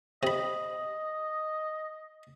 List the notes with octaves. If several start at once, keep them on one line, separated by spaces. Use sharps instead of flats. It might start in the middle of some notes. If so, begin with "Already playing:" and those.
C3 D#5 B5